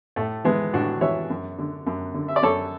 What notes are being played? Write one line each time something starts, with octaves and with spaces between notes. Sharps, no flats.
A2 A3
E3 G#3 B3
A2 D4 F#4
E3 C#5 E5
F#2
D3
F#2
D3
E5
D5
F#2 A4 C#5